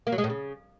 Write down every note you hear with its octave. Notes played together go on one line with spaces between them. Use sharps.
A#3
F#3
G#3
A2
C#3